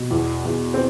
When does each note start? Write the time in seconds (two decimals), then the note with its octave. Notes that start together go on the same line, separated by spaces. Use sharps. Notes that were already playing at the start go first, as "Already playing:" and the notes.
Already playing: B2
0.11 E2
0.45 E2
0.74 C4